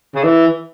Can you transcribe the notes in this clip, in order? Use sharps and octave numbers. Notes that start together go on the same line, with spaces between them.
C#3
E3